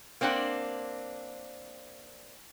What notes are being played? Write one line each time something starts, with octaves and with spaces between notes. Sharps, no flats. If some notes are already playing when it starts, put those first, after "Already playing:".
A#3 C4 D4 F4 F#5